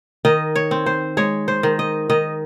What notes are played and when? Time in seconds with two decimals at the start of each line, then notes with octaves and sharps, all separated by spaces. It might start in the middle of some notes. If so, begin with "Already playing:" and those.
0.25 D#3 D#5
0.56 C#5
0.71 C4
0.86 C5
1.17 G#3 C#5
1.48 C5
1.63 D#3
1.79 D#5
2.10 D#3 D#5